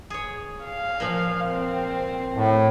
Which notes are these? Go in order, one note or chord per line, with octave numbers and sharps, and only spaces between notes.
G#4 C#5
F5
A#2 F3
C4
A2